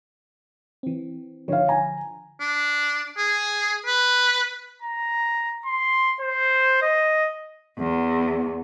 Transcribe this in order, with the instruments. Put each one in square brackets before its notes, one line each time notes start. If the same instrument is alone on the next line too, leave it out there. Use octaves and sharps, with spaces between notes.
[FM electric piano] E3 C4
[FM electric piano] D3 F3 [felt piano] C#5 F5
[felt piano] G#5 A#5
[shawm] D4
G#4
B4
[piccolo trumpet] A#5
C6
C5
D#5
[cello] E2